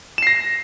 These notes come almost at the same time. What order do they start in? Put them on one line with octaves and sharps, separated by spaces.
E7 C7 A#6